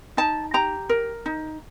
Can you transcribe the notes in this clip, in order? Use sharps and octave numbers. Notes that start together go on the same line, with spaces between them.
D#4 A5
G4 A#5
A#4
D#4